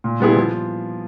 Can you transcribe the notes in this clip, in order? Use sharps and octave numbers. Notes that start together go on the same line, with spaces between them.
A#2
G3 B3 E4 G#4
F3